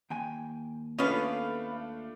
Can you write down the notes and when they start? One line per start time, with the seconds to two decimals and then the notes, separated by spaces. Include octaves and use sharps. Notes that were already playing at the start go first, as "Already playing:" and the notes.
0.10 D#2 G5 G#5
0.99 A3 B3 C#4 D4 F4 B4 F5